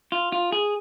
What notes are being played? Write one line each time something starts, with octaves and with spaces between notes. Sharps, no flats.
F4
F4
G#4